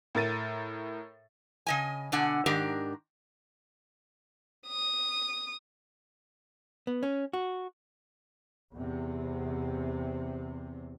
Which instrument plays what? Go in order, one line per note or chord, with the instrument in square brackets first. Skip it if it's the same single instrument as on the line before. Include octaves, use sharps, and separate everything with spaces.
[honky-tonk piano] A2 A#4 A6 D#7
[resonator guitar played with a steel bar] C#3 D#5 G#5
B2 D3 D4 F#5 G#5
G#2 D#3 D4 G4 A#4
[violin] D#6
[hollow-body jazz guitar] B3
C#4
F#4
[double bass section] E2 C3